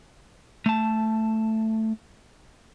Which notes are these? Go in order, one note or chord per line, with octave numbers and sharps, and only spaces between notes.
A3 A5